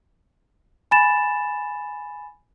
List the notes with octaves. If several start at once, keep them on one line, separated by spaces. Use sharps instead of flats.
G#5 B5 A6 E7